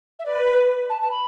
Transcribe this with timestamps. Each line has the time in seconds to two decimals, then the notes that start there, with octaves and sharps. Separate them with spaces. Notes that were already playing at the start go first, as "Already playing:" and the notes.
0.19 E5
0.25 B4 D5
0.89 A5
1.01 A5
1.11 B5